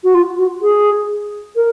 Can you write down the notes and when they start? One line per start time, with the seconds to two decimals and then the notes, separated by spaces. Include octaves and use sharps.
0.04 F#4
0.15 F4
0.39 F#4
0.62 G#4
1.56 A#4